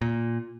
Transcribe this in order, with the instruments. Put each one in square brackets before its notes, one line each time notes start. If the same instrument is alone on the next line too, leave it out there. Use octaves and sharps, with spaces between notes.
[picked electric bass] A#2